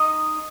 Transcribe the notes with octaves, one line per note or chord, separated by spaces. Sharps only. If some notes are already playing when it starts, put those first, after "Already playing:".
Already playing: D#4 D#5 D#6